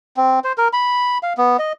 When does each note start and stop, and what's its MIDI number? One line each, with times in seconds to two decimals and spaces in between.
0.17 0.39 60
0.44 0.53 72
0.58 0.68 70
0.73 1.18 83
1.23 1.33 77
1.37 1.57 59
1.59 1.72 75